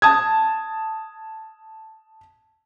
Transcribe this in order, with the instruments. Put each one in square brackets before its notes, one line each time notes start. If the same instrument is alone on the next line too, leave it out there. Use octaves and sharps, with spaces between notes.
[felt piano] A5 D#6 G#6